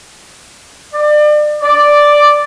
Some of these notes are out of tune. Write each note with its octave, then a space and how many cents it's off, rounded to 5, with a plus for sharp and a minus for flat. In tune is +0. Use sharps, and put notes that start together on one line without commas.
D5 +35
D5 +0